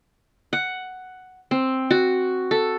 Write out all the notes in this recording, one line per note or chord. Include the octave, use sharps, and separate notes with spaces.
F#5
C4
F#4
A4